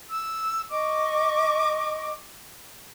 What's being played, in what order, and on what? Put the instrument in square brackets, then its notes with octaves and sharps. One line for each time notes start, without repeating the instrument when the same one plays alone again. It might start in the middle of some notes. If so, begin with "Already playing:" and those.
[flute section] E6
D#5 C#6 D6